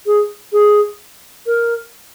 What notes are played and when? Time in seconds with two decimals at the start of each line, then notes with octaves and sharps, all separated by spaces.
0.06 G#4
0.53 G#4
1.46 A#4